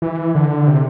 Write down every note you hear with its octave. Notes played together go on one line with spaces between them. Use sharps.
E3
D3
C3